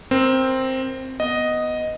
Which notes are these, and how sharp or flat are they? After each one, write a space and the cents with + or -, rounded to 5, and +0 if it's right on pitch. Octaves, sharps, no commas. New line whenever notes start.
C4 +5 A#4 +15
B3 +0 D#5 +0